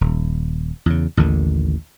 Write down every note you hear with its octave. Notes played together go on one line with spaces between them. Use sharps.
D#1
E2 C#3
A1 D#2 D3 D#3